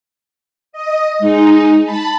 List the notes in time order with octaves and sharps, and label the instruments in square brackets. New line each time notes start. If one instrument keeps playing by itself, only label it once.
[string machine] D#5
[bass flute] G#3 [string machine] D#4
[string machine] A5 B5